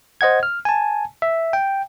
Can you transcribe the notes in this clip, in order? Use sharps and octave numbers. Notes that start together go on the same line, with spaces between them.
C5 D#5 F#5 G#6
F6
G#5 A5
E5
G5